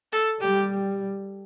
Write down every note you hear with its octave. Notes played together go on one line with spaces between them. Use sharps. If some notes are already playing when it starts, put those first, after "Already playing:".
A4
G3 G4